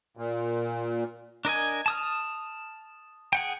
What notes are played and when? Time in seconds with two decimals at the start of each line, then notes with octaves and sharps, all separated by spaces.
0.17 A#2
1.45 D4 A#4 D#5 G#5
1.86 A5 D#6 F6
3.33 G#4 F#5 G5